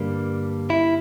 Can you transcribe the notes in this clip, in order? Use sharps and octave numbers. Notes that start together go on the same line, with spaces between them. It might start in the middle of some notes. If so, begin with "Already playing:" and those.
Already playing: G2 D3 G3 A#3
E4